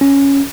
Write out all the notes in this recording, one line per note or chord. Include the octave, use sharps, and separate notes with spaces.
C#4